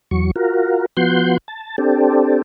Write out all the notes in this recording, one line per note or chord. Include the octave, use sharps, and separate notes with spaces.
E2 F#3 C#6
F4 F#4 A#4
F3 B3 F#4 F#5 C6 G6
A5
C4 D4 G4 A4